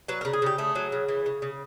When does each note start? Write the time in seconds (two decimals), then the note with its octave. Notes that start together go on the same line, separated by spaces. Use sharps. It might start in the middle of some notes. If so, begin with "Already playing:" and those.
0.08 F#3 B4
0.21 C#3 A#4
0.33 G#4
0.42 C#3 G4
0.58 A3 G#4
0.75 F#3
0.92 C#3
1.08 E3
1.26 C#3
1.42 C#3